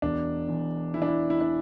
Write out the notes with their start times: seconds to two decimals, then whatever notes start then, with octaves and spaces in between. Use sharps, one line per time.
0.02 E1 D4
0.48 E2
0.94 E3 E4
1.02 D4
1.09 E4
1.30 E4
1.41 D4